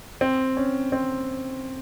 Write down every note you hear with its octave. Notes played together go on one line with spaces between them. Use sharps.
C4
C#4
C4